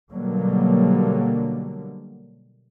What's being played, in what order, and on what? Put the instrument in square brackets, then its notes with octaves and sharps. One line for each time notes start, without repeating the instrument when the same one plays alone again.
[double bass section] B2 D3 F#3 G3 A#3